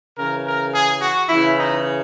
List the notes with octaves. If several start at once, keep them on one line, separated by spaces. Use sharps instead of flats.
C#3 E3 A#4
A#4
G#4
F#4
C#3 E3 E4
D#4